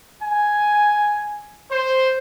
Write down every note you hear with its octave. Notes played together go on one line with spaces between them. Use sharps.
G#5
C5